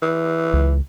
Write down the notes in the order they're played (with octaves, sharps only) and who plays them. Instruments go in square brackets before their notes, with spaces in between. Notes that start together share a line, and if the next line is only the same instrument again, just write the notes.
[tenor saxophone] E3
[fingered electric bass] C#2